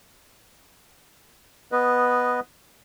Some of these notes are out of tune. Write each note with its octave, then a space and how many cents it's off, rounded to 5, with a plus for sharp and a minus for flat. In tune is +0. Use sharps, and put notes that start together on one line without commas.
B3 +0 B4 +0 D#5 -5